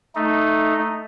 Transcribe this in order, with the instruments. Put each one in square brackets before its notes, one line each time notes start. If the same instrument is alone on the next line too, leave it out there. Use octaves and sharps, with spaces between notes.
[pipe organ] A3 D#4